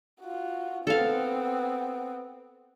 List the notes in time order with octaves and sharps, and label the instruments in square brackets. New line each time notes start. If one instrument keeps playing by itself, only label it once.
[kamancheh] F4 F#4
[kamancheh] B3 C4 [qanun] A4 F5